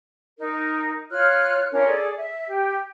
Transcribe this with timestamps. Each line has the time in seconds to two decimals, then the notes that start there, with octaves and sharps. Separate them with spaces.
0.38 D#4 A#4
1.10 F4 C#5 F6 F#6
1.71 C#4 D4 F4 A#4
1.85 G#4 A4 D5
2.17 E5
2.46 G4